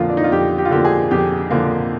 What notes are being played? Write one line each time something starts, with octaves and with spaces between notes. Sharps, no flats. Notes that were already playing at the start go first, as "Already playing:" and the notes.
Already playing: F2 D3 F3 A#3 F4
D4
D#4
F4
F2 G4
G4
F4
D3 F3 A#3 G4
G#4
F2 G4
D3 F3 A#3